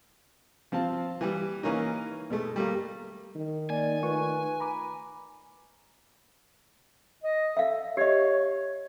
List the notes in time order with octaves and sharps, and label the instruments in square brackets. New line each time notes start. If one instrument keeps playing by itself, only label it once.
[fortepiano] F3 C4 F5 A5
E3 G3
E3 A#3 C#4 D#4
B2 G#3 A3
G3 A3 A#3
[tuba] D#3
[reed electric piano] A#3 [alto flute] D5 [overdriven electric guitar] G#5
[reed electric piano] A3 F4 C#6 [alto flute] B4
[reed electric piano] A#5 B5 D6
[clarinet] D#5
[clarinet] A4 [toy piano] E5 F5
[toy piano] G4 D#5 [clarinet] C#5